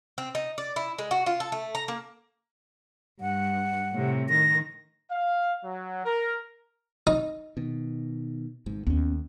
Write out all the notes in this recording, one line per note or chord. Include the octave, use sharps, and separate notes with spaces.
C4
D#4
D5
E4
G#3
F#4
F4
A4
A3
A#5
A#3
G2 F#5
A2 C3
D#3 A#6
F5
F#3
A#4
D#4
B2 D#3
G#1 G#2
D#2 B3 C#4